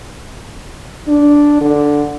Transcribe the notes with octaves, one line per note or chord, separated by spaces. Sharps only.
D4
D3